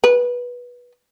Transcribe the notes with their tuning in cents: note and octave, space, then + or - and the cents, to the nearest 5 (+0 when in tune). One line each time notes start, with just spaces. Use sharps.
B4 -15